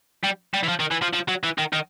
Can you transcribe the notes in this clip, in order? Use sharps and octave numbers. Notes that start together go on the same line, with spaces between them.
G3
G3
E3
F3
D#3
E3
F3
F3
F#3
E3
D#3
D#3